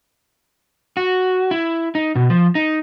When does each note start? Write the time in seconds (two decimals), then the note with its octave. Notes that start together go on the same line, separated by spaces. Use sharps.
0.97 F#4
1.51 E4
1.95 D#4
2.15 B2
2.30 F3
2.55 D#4